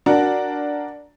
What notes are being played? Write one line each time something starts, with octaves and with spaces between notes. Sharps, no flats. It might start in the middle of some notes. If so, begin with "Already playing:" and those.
D4 F#4 A#4